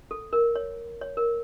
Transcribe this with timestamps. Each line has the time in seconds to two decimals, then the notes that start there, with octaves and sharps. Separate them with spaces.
0.11 A4
0.33 A#4
0.56 C#5
1.01 C#5
1.17 A#4